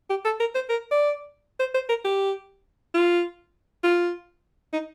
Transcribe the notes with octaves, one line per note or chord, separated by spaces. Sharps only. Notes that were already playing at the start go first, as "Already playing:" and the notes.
G4
A4
A#4
C5
A#4
D5
C5
C5
A#4
G4
F4
F4
D#4